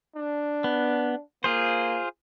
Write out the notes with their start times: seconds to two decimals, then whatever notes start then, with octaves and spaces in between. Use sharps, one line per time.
0.16 D4
0.64 B3
1.44 A#3 F4 G#4 C5